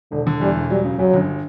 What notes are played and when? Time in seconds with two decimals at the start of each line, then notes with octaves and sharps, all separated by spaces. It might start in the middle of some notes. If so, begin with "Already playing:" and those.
0.12 E1 D3
0.27 D3
0.41 E2 G3
0.56 E1
0.70 F#3 G3
0.85 C#3
0.99 F#2 F#3
1.14 G1